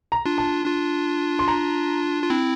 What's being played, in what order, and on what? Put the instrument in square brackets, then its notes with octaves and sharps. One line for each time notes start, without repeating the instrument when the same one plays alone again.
[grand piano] A#5
[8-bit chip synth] D4 F4
[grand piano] A5
[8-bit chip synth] D4 F4
[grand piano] C6
A#5
[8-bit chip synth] F4
C4 E4